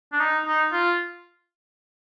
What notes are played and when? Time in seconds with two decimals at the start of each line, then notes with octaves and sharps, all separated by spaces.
0.13 D4
0.20 D#4
0.46 D#4
0.73 F4